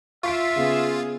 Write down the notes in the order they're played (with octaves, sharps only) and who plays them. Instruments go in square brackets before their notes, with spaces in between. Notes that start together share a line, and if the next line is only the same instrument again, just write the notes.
[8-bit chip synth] F4 [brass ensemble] E5 [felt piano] C#6 B6 D7
[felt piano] C#3 B3 [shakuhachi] G#4